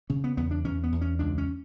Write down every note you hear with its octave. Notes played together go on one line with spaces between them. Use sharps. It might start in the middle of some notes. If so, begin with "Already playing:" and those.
C#3 C#4
B3
E2 B3
D4
E2 C#4
B3
E2
C#4
C#2 D4
C#4